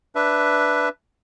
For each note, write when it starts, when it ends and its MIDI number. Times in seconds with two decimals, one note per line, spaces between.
0.15 0.89 62
0.15 0.89 71
0.15 0.89 76